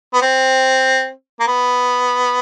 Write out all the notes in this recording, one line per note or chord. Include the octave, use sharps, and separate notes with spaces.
B3
C4
A#3
B3